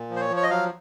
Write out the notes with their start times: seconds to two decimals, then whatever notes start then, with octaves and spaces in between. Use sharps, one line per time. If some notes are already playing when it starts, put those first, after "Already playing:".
Already playing: A#2
0.10 F3
0.16 C5
0.21 C#5
0.30 F3
0.37 C#5
0.43 D#5
0.50 F#3 F5